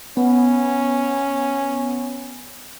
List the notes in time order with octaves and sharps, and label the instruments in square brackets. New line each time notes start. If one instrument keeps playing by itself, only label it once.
[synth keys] B3 [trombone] C#4